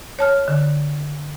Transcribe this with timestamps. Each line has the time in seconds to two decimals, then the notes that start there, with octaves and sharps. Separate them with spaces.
0.19 C#5 A5 F6
0.48 D3